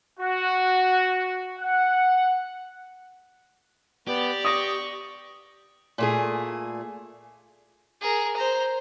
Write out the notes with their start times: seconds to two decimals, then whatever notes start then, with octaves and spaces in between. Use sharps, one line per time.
0.20 F#4
1.60 F#5
4.07 B3 G4 D5
4.45 C#6 D#6 A#6
5.98 A#2 A3 G#4
8.01 G#4 A#4
8.36 C5 A#5